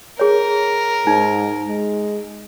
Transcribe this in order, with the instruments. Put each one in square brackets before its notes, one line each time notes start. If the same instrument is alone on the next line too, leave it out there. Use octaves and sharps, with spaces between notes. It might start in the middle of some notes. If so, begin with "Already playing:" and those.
[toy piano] G#4 C#5 [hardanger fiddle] A#4
[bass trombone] G#2 [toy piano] D#4
[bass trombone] G#3